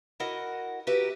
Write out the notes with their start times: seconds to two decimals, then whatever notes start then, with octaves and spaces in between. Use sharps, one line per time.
0.20 E4 F#4 A#4 D#5 F#5
0.87 F#4 G4 A#4 B4 E5